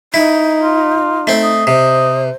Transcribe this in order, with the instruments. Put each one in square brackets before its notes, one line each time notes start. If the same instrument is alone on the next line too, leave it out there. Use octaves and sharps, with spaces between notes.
[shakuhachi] D#4 [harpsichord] E4
[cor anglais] F4
[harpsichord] A3 C4
[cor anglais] D#5
[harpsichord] C3 [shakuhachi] C5